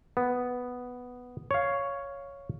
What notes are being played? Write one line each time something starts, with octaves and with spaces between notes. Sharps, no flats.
B3
C#5 F5